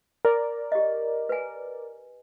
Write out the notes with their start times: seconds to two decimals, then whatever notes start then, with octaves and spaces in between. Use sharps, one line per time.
0.25 A#4 D5
0.72 G4 D#5
1.29 B4 G#5